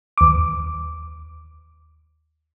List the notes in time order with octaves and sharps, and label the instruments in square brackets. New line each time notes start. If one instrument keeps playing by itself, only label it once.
[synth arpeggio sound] D#2 D6